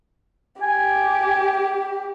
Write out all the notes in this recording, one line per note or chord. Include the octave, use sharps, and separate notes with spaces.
G4 G#5